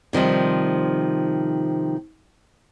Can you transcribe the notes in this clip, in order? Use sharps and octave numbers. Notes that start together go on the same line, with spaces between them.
C3 D#3 F3 G3